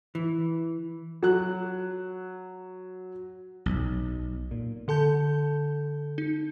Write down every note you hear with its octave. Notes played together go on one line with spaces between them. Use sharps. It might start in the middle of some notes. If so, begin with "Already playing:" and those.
E3
F#3 F#6
B1
A#2
D3 A4 A5 G6
D#4